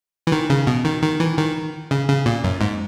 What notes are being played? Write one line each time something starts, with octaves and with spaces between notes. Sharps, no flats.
E3
D#3
C#3
B2
D#3
D#3
E3
D#3
C#3
C#3
A#2
F#2
G#2